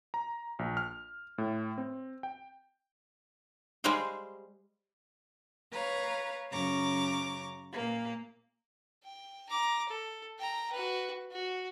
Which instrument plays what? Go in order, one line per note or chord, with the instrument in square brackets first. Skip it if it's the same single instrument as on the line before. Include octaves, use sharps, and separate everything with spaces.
[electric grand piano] A#5
A#1
F6
A2
C4
G5
[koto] G3 G#3 G#4 C5 F5 G5
[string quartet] B4 C#5 F5 A#5
F#2 C#3 A#5 C#6 D6
A#2 A#3
[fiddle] G5
A#5 D6
A4
G5 A#5
F#4 B4
F#4